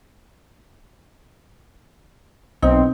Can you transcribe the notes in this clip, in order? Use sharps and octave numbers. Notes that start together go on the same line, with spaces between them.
B1 C4 D#4